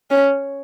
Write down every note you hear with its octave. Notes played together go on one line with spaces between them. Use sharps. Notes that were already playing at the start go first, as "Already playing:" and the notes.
C#4